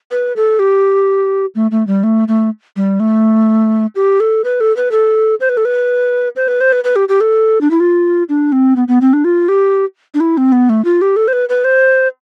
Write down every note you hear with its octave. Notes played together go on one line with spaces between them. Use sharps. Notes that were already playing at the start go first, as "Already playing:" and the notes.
B4
A4
G4
A3
A3
G3
A3
A3
G3
A3
G4
A4
B4
A4
B4
A4
C5
B4
A4
B4
C5
B4
C5
B4
B4
G4
G4
A4
D4
E4
F4
D4
C4
B3
B3
C4
D4
F4
G4
D4
E4
C4
B3
A3
F4
G4
A4
C5
B4
B4
C5